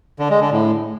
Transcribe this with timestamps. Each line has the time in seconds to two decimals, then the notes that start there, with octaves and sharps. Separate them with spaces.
0.19 D3
0.30 G#3
0.41 D3
0.52 A2